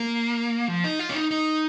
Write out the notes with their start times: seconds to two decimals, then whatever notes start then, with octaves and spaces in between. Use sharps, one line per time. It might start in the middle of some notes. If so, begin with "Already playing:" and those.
Already playing: A#3
0.68 F3
0.84 D#4
0.99 F4
1.10 C#4
1.15 D#4
1.31 D#4